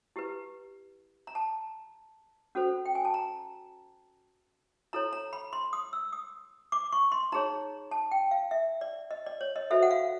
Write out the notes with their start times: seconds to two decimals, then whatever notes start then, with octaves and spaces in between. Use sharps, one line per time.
0.16 E4 G4 B4
1.27 A#5
1.35 A5
2.55 C#4 F#4 A4 C5
2.86 G5
2.95 G#5
3.05 A5
3.14 A#5
4.93 E4 A4 C#5 A#5
5.13 A#5
5.33 B5
5.53 C6
5.73 D#6
5.93 E6
6.13 D#6
6.72 D6
6.92 C#6
7.12 C6
7.32 D#4 G#4 C#5 A#5
7.91 A5
8.11 G5
8.31 F5
8.51 E5
8.81 D5
9.11 D#5
9.26 D5
9.41 C#5
9.56 D#5
9.70 F#4 A4 C5 E5
9.82 F#5
9.91 F5